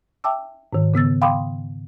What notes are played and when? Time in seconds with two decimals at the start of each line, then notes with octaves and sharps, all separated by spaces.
0.24 E5 G5 A5 D6 E6
0.73 G#2 D#3
0.94 C#3 B3 E6 A6
1.22 F5 G5 B5 C6 D6 D#6